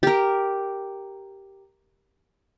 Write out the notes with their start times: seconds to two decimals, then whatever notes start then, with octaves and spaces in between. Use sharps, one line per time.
0.03 G4 A#4